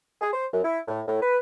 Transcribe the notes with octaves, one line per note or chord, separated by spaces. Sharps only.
G#4
C5
F#2
E4
A2
A2
B4